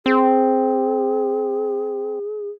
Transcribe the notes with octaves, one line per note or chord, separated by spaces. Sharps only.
C4 G#4